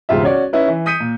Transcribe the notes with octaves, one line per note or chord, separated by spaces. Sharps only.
E1 C#2 G#2 F4 G4 E5
C#4 F#4 C#5 D5
C#4 D#4 E4 B4
E3
D#6 G6 B6 C#7 D#7
A#2